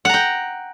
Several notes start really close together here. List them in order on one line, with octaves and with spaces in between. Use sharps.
F#5 A#5 G5